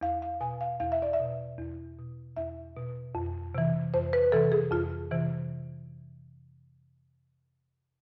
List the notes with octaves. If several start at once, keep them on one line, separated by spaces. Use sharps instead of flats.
E2 F5
F5
B2 G#5
F5
E2 F5
E5
D5
E5
B2
E2
B2
E2 E5
B2
F2
C3 E3
F2 C5
B4
C3 E3 A4
G#4
F2 F4
C3 E3